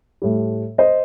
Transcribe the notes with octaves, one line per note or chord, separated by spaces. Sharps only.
A2 G3
C5 D#5